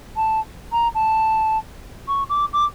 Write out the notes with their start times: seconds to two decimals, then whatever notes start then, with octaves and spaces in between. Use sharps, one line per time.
0.16 A5
0.72 A#5
0.95 A5
2.08 C#6
2.30 D6
2.53 D6